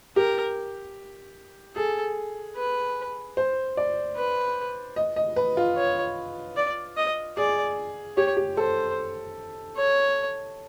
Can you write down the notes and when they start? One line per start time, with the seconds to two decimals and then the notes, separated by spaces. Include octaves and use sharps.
0.16 G4 A#4
1.76 G#4 A4
2.57 B4
3.37 C5
3.77 D5
4.17 B4
4.96 D#5
5.16 D#5
5.36 B4
5.57 F4
5.77 C#5
6.57 D5
6.97 D#5
7.37 G#4 D5
8.17 G4 C#5
8.37 G4
8.57 A4 C5
9.78 C#5